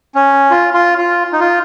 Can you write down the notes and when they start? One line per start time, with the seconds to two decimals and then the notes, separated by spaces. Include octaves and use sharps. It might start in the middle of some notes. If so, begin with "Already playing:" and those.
0.15 C#4
0.51 F4
0.74 F4
0.98 F4
1.32 D#4
1.40 F4